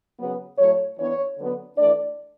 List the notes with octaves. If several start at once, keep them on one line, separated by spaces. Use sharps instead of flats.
C#3 F#3 B3
A2 F#3 A3 C#5
E3 B3 D4 C#5
D3 F#3 B3
E3 A3 D4 D5